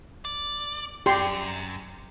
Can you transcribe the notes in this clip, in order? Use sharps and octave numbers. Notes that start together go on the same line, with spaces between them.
D5
F#2 G4 C6